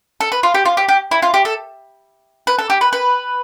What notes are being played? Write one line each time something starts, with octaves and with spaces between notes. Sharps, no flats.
A4
B4
F4
G4
F4
G4
G4
E4
F4
G4
A4
B4
A4
G4
B4
B4